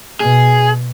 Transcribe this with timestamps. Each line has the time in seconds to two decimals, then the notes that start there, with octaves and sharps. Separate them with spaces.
0.20 B2 G#4